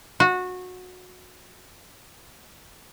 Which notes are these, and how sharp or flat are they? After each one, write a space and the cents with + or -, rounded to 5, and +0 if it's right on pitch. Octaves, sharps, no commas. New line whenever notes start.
F#4 -20